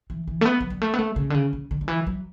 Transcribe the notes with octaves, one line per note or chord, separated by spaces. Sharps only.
E3
E3
A3
B3
F#3
G3
A3
B3
A3
C#3
D3
C#3
C#3
D3
D3
E3
F#3